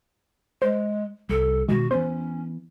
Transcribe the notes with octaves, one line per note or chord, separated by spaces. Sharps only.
G#3 C5
C2 G3 A4
B2 D#3 G#3 F#4
E3 B3 C#4 C5